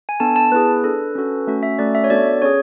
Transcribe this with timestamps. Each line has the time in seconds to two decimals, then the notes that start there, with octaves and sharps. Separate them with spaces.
0.09 G#5
0.20 B3 D4 A4 A5
0.36 A5
0.52 B3 E4 G#4 B4
0.84 D4 A4
1.15 C#4 F#4 A4
1.47 A3 C#4 F#4
1.63 E5
1.78 A3 C#4 F#4 A4 D5
1.95 E5
2.04 C#5
2.10 B3 D4 F#4 A4 D5
2.42 C#4 G#4 C#5